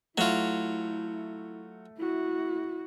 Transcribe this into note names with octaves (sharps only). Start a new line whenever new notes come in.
F#3 A3 E4 F4
E4 F#4